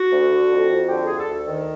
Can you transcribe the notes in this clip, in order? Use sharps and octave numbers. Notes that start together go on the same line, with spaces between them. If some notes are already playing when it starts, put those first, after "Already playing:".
Already playing: F#4
D2
D3
F2
F2
D3 G4
D2 G#4
A4
D2
D#3